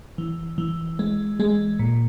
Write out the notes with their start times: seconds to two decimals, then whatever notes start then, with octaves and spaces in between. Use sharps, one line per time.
0.18 E3
0.58 E3
0.99 G#3
1.40 G#3
1.79 A#2